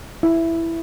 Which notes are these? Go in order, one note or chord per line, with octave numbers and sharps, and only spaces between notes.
E4